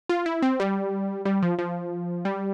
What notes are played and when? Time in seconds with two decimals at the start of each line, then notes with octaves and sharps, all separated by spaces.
0.09 F4
0.26 E4
0.42 C4
0.60 G3
1.25 G3
1.42 F3
1.59 F3
2.25 G3